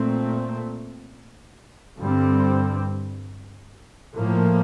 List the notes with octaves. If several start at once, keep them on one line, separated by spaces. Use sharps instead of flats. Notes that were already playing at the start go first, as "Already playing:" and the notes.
Already playing: A#2 A3 C4
G2 D3 G3 C4
A2 F3 A#3